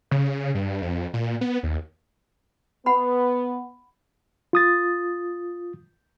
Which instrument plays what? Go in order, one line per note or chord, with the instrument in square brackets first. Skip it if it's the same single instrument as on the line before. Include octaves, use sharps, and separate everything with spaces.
[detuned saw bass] C#3
G2
F2
A#2
B3
D#2
[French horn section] B3 [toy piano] F#5 B5
[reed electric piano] F4 D#6 A6